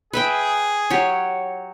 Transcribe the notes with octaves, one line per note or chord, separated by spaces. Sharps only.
G#4 B4 E5 G5
F#3 G4 C#5